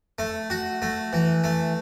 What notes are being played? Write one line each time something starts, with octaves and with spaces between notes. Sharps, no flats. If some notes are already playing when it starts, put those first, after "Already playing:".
A3
F#4
A3
E3
A3